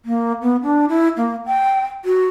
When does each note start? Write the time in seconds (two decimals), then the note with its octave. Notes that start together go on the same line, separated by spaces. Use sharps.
0.05 A#3
0.42 B3
0.63 D4
0.89 E4
1.17 A#3
1.46 G5
2.05 F#4